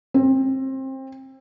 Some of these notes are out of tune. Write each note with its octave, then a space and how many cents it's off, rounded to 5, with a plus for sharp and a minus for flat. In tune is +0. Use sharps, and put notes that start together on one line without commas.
C4 +25